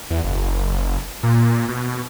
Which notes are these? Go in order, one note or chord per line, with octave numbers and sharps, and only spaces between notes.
E2
F#1
A#2
B2